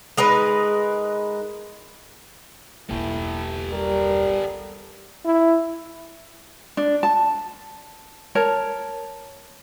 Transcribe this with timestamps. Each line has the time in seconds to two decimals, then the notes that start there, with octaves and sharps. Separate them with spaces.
0.17 G#3 D#4 A#4 B4
2.90 E1 B1 A#3 E4 G4 A4
3.72 G3 A#4
5.25 E4
6.77 D4
7.03 A5
8.35 A#4 C#5 A5